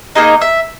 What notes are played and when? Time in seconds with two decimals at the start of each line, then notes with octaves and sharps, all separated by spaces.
0.15 A#3 D#4 G#4 D#5
0.41 E5